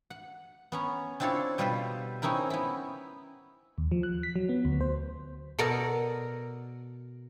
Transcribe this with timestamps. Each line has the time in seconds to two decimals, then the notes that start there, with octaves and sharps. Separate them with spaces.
0.10 F#5
0.72 B3 C#4 A#5
1.20 C4 D4 E4 F4 A4 C#5
1.58 B2 G3 F4 B4 C5
2.22 C4 C#4 D#4 E4 A#4
2.50 B3 E4
3.78 D#2
3.92 F3
4.03 F#6
4.23 B6
4.36 F#3
4.49 B3
4.65 D2
4.81 C5
5.59 B2 A4 A#4 D5